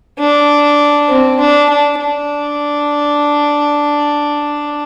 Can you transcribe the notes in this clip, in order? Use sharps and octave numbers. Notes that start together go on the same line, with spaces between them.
D4
C4
D4
D4
D4